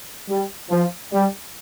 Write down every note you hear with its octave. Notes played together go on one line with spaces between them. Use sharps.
G3
F3
G3